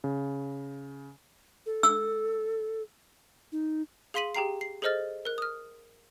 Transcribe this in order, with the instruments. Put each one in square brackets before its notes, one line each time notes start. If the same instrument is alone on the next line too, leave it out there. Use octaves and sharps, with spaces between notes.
[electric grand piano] C#3
[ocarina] A4
[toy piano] E6
[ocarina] D#4
[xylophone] G#4 F5 C6 B6 D#7 F#7
G4 G#4 G5 A#5 C7
C7
G#4 A4 C5 D#5 F6 A6
A#4 F#6
D#6 F6